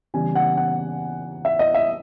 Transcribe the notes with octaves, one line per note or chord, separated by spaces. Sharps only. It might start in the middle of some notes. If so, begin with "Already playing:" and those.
C#3 E3 G3 B3 G#5
F#5
F#5
E5
D#5
E5